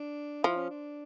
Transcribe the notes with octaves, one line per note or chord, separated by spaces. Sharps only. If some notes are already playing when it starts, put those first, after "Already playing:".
Already playing: D4
F3 E4
C#4
D4